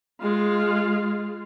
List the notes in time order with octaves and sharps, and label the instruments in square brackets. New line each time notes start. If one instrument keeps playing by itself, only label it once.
[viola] G#3 F4